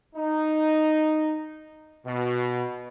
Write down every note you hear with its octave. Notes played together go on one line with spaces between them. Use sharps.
D#4
B2